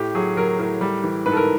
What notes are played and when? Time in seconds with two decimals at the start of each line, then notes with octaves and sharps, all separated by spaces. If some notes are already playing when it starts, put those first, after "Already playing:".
Already playing: A2 G4
0.15 F#3 G#4
0.37 F#3 A#4
0.59 A2 A#4
0.81 G3
1.04 E3
1.26 G#2 B4
1.32 A4
1.37 A#4